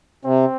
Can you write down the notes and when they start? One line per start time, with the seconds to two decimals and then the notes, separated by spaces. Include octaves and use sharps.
0.25 C3 C4